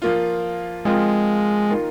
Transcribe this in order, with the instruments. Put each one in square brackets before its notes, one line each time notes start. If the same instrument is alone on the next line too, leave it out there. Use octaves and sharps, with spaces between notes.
[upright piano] F3 A#3 F4
[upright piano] F3 C4 F4 A#4 [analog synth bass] G#3
[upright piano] D#3 A#3 F4 A#4